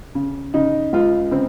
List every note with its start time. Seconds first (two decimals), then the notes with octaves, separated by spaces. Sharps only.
0.15 C#3
0.54 C#3 D#4
0.93 C#2 F4
1.31 C#3 C4